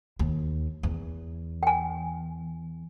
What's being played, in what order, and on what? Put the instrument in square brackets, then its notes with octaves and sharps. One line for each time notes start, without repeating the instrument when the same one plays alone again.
[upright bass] D#2
E2
[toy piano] G5 G#5